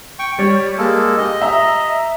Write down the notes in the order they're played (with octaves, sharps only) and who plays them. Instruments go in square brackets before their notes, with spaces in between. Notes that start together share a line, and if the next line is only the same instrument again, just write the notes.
[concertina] G5 C#6
[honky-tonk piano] G3 [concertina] C#5 D5
[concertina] G#3 A#3 A4
[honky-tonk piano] G4 [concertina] D#5
[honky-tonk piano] E5 A#5